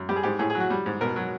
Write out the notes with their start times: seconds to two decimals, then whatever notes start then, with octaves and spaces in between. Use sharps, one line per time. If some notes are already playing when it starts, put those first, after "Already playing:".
Already playing: F#2
0.09 G3 G4
0.16 G#4
0.23 G#2 G4
0.39 A2 G#4
0.50 G#4
0.55 F#3
0.60 F#4
0.70 G3
0.86 G#2
1.01 B2 A#4
1.16 F#3